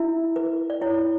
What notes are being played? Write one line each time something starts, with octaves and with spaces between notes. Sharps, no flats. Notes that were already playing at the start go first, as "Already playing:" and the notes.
Already playing: E4 E5
B4
D5
E4 C#5